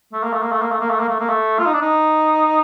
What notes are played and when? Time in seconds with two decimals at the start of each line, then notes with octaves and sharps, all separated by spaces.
0.13 A3
0.23 A#3
0.33 A3
0.42 A#3
0.52 A3
0.61 A#3
0.72 A3
0.80 A#3
0.90 A3
1.00 A#3
1.09 A3
1.19 A#3
1.29 A3
1.59 F4
1.66 D#4
1.73 D4
1.82 D#4